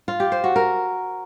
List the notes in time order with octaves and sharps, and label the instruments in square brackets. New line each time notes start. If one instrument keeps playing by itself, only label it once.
[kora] F4
G4
C5
F#4
A#4